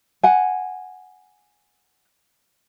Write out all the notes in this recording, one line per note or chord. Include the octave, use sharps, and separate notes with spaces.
F#5 G#5